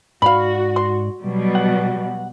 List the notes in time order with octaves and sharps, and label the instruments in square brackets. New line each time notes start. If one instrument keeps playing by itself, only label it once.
[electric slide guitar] G#2 D5 [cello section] F#4 [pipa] F5 B5
[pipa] C6
[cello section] B2 F#3 G3
[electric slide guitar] F#5